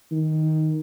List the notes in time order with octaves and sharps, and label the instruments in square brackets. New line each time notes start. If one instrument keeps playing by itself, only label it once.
[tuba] D#3